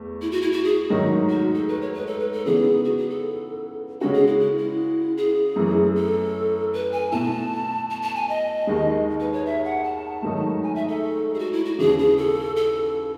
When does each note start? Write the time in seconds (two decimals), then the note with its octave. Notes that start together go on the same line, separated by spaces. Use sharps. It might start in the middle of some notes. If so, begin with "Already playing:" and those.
Already playing: E2 A3
0.22 E4
0.31 F#4
0.42 E4
0.52 F#4
0.64 G#4
0.90 G#2 D#3 F#3 A3 D#4
1.29 F#4
1.55 A4
1.68 B4
1.81 C#5
1.94 B4
2.07 A4
2.19 B4
2.32 A4
2.46 C#3 E3 B3 G#4
2.85 F#4
2.98 G#4
3.10 A4
4.01 C#3 G#3 C#4 F#4 A4
4.13 G#4
4.27 E4
4.39 E4
4.58 E4
5.17 G#4
5.56 F#2 E3 A3
5.96 A4
6.73 B4
6.92 G#5
7.12 B2 A3 E4 A5
7.90 A5
8.02 A5
8.16 G#5
8.29 D#5
8.67 D#2 D#3 G#3
9.20 B4
9.33 C#5
9.45 E5
9.64 F#5
9.84 A5
10.22 G#2 D#3 F#3 A3 D#4
10.63 G#5
10.75 E5
10.88 A4
11.34 G#4
11.39 F#4
11.53 E4
11.65 F#4
11.79 D#2 C#3 E3 G#4
11.98 G#4
12.18 A4
12.56 A4